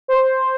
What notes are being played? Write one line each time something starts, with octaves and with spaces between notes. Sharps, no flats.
C5